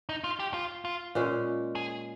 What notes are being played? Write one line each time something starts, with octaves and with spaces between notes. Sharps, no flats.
D#4
F4
G4
F4
F4
A#2 G#3 C#4
G#4